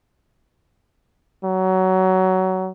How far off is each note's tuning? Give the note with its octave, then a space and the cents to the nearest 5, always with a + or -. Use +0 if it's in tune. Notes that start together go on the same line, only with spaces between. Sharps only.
F#3 +20